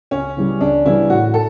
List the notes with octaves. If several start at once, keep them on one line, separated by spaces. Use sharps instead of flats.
C#2 C#4
C#3 E3 G3
C#2 D4
C#3 E3 G3 E4
A2 F#4
A4